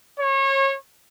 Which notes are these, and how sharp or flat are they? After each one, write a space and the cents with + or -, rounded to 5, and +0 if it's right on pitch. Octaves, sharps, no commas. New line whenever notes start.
C#5 -30